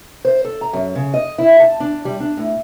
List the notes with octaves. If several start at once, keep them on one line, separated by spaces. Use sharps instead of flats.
C5
A4
A#5
F#2
C#3
D#5
E4
A5
D4
G3
D4
A2